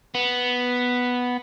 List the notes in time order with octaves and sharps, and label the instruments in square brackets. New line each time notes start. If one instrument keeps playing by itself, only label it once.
[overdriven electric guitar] B3